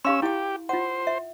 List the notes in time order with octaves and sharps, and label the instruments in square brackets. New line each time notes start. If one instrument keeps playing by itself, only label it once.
[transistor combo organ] C#4 E6 [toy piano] G4 F5 C6
[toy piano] E4 G5 [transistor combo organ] G4
[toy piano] F4 F#5 [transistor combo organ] C5
[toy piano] E5